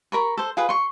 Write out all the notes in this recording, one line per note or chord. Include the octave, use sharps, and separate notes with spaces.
A#4 B5 C#6
A4 C5
F4 G#4 B4
C6 C#6